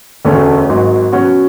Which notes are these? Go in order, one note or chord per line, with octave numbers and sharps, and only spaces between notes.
E1 D2 D3 A3 C#4
G#1 G#2 F#3
B2 F#3 C#4 F#4